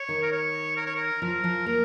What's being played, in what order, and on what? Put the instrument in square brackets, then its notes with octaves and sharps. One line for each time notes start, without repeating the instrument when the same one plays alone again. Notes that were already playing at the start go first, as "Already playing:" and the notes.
Already playing: [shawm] C#5
[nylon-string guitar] D#3
[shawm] A#4
C#5
A#4
C#5
A#4
[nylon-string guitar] F3 [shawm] A#4
[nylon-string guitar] F3
[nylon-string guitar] A#3 [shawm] A#4